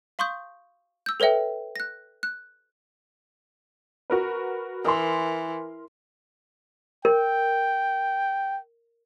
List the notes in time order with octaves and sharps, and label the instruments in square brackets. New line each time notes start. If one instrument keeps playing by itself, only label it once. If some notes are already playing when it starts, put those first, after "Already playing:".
[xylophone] F5 C6 C#6 D#6 G6
E6 G6
A4 B4 C#5 E5 G5
F#6 A#6
F#6
[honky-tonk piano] F#4 A#4 B4
[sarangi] E3 [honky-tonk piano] A#4 C6
[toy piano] A#4 [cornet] G5